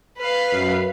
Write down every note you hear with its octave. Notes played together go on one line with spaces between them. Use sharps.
B4 F5
F#2